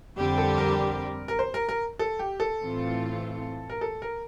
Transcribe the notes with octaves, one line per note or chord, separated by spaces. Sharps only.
F2 D3 G3 C4 G4
A4
A#4
A#4
C5
A#4
A#4
A4
G4
A4
A2 E3 A3 C4 F4
A#4
A4
A#4